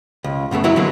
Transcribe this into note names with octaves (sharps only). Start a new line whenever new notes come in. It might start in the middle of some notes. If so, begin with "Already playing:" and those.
C#2
F#2 C#3 A3 B3
F#3 E4 F#4 A#4
D3 F#3 G#3 A#3 B3